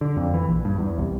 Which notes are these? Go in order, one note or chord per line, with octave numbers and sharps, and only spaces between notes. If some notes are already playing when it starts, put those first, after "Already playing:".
D3
F2
E3
A#1
G2
E2
C2